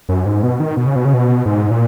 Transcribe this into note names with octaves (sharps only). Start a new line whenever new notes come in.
F#2
G#2
B2
D#3
B2
C#3
B2
C#3
B2
G#2
A#2